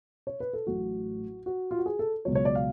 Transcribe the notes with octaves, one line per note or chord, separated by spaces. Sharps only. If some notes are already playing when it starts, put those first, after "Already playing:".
C#5
B4
A4
A1 A2 F#3 F#4
F#4
F4
F#4
G#4
A4
C#2 B2 F#3 C#5
C#5
D5
F5